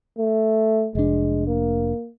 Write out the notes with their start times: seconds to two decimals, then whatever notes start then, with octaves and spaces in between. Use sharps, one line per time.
0.18 A3
0.95 F1 G#3 D4
1.47 A#3